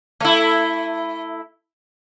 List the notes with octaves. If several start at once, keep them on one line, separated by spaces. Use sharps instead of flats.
A3 E4